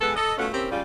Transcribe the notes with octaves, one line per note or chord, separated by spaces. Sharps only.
E3 G#3 B3 A4
A4 D#5
B2 A3 B3 C#4 F4 A4
A#3 C4 C#4 E4 G4 A#4
C#3 G3 F4